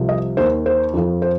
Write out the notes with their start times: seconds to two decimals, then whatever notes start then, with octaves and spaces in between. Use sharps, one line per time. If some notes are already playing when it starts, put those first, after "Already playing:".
Already playing: C2 C3 F3
0.09 D#5
0.37 D#2 D#3 C5
0.66 C5
0.94 F2 F3
1.22 C5